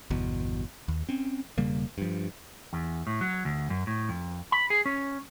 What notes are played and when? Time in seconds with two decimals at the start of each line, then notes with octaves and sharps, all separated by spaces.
0.10 G1 E2 B2
0.88 D#2
1.09 C4 C#4
1.58 E1 C#3 G3 A#3
1.98 G2 F3
2.73 E2
3.07 A2
3.21 F#3
3.45 D2
3.70 F#2
3.87 A2
4.09 F2
4.52 B5
4.70 G#4
4.85 C#4